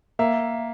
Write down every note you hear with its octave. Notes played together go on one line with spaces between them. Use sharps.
A#3 E5